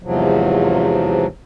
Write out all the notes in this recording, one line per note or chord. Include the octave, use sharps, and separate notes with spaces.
E2 G#2 C3 F3 F#3